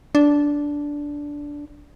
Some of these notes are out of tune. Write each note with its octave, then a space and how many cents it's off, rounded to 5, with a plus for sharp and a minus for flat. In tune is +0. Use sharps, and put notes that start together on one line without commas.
D4 -10